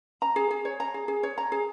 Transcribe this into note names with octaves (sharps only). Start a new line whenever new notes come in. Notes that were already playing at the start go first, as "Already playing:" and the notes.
A#5
G#4
G#4
C#5
A#5
G#4
G#4
C#5
A#5
G#4